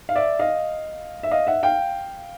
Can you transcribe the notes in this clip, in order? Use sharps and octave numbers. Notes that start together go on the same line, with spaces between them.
F5
D5 E5
D#5 F5
E5
D#5 F5
E5 F#5
F5 G5